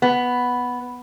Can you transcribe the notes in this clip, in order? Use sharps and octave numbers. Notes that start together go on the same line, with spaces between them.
B3